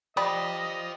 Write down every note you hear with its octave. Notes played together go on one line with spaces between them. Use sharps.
G4 C5 D5 D#5 F5 B5 D#6